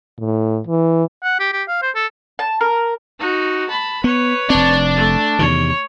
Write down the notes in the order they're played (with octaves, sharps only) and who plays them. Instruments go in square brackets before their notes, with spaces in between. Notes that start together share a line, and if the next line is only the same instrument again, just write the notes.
[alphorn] A2
E3
[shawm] F#5
G4
G4
F5
C5
A4
[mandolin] A5
A#4
[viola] D#4 F#4
A5 B5
[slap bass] B3 [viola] B4 C#5
[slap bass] F1 C4 [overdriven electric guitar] D4
[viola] A3
[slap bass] E2 C3 D#3 [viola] C#5